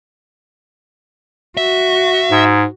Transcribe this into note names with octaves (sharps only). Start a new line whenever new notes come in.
F#4 E5
G#2